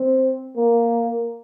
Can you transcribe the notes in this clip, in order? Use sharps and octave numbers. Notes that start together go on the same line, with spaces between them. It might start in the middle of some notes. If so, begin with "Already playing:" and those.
Already playing: C4
A#3